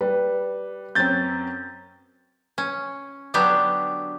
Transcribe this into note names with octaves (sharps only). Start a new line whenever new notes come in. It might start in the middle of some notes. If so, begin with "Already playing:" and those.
G3 B4
F#2 C4 C#4 G6 A6
C#4
D3 F#3 B3 D4 G4